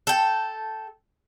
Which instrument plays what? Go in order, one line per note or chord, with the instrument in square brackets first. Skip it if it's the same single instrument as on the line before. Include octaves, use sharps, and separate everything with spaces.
[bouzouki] A4 G5